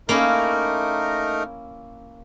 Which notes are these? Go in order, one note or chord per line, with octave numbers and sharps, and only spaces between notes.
A3 A#3 C#4 D#4 E4 A#4